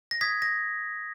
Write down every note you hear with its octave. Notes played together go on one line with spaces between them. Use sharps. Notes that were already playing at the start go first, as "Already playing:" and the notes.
A#6
D#6 G#6 B6
A#6